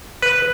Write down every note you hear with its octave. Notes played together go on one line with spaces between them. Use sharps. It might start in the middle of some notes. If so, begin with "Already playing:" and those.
B4